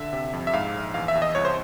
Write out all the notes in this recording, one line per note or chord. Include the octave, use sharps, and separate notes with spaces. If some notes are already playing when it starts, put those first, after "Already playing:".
Already playing: D3 E5
C3
F2
E5
G#2 F5
A#1
E2 F5
E5
E2
D#5
C2 C#5
C5